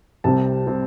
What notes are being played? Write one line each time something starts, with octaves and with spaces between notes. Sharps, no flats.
C2 C3 G3 C4 A5
C3 G3 C4